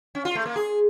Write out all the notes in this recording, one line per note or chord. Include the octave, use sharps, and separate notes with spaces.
C#4
F4
A3
A#3
G#4